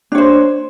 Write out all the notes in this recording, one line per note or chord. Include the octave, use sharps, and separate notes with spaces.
D4 C5 C#5